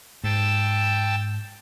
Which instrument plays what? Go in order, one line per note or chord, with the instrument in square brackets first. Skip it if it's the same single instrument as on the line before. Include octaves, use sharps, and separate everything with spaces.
[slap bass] G#2 [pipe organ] G5 A5 E6